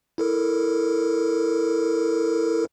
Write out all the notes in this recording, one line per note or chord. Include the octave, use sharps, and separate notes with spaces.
E4 A4 A#4